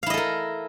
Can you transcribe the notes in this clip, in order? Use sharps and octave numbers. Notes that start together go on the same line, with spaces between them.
E4 A4 A#4 D#5 F5